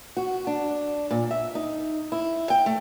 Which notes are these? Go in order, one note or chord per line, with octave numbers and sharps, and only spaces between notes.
F#4
D4
A#2
E5
D#4
E4
G5
A3